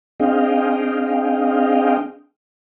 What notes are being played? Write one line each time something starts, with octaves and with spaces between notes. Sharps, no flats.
C4 D4 G#4 D#5 F5 G5